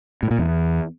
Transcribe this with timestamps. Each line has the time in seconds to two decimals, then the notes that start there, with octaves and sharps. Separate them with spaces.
0.23 A2
0.31 A#2
0.39 E2